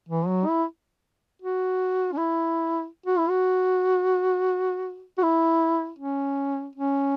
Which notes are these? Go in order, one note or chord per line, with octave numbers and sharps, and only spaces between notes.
E3
F#3
E4
F#4
C#4
E4
F#4
E4
F#4
F#4
E4
C#4
C#4